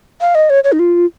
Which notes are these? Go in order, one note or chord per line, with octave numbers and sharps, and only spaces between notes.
F5
D#5
C#5
C#5
D#4
F4